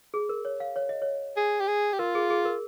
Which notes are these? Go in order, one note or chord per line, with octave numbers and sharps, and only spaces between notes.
G#4
A#4
C#5
F5
C#5
D#5
C#5
G#4
G4
G#4
G4
F4 A#4
G#4
G#4
A#4